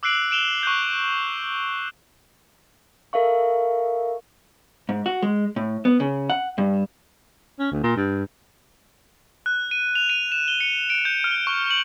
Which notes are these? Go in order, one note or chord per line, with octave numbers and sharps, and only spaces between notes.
D6 E6 F#6 C7 D7 F#7
D7 E7 F7 G7
C#6 F#6 G6
A4 A#4 E5 F5 C#6
G#2
F#4
G#3
A2
B3
C#3
F#5
G2
C#4
D2
A#2
G2
F#6
D#7
F7
D#7
E7
G7
C#7
D7
G6
F6
C#6
F#7